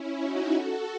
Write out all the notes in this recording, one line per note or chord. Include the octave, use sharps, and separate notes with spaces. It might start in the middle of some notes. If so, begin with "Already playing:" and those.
Already playing: C#4 E4
D#4 F#4
F#4 A4